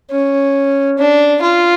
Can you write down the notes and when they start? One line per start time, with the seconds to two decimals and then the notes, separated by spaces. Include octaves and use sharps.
0.11 C#4
0.98 D4
1.42 F4